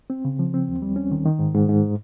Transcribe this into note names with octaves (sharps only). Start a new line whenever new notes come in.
C4
C#3
F3
C4
D#2
G3
C#4
D#3
D#3
G#2
G#2
G#2